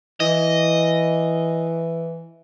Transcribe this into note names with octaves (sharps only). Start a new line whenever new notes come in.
E3 D#5